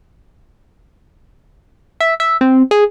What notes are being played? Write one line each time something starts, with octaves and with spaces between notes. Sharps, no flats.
E5
E5
C4
G#4